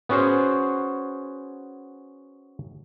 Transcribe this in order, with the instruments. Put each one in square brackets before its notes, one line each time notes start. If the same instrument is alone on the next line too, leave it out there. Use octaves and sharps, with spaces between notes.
[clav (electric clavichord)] B3 C#4 F#4 G#4 C5